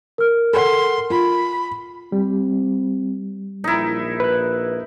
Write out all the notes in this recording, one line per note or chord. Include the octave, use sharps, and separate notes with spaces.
A#4 F6
A4 F#5 C6
F4 B5
G3 C4
A#1 D#4 E4
B4 F#6